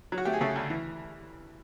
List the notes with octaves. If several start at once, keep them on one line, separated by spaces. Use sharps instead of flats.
F#3
F#4
A3 G4
G#4
C#3 A3 A4
D2
E3